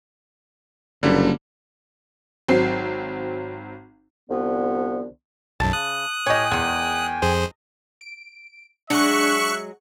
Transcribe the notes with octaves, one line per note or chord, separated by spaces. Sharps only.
F#1 D3 G3 A#3
G#1 F#3 C4 C7
C2 D3 F3 B3
B1 F#2 A5
C#3 D#6 F#6
A2 G4 C#5 D#5 G5 G#5
E2 D#3 G#3
F2 G#4 C5
D7
F#3 G#3 D4 E5 C#6 F#6 C#7